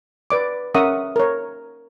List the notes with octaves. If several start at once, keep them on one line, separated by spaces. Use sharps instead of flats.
B4 D5 D6
C#4 A#4 E5 F#5 C#6 D#6
A#4 C#5